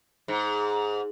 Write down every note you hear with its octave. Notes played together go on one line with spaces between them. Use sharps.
G#2